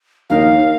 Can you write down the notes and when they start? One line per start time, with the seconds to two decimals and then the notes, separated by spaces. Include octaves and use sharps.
0.30 D#2 D#3 A#3 D#4 A#4 F5